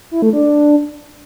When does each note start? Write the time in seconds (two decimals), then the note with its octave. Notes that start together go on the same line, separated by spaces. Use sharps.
0.11 E4
0.22 A3
0.33 D4